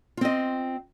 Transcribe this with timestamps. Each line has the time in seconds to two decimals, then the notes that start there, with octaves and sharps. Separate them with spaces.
0.17 F4
0.21 C4
0.25 D#5